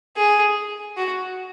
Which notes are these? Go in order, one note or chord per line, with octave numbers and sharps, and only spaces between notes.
G#4
F#4